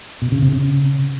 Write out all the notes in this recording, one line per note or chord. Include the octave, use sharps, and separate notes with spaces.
B2
C#3
C3
C#3